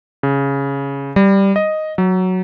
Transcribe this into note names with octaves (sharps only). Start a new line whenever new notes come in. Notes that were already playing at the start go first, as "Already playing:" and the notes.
C#3
G3
D#5
F#3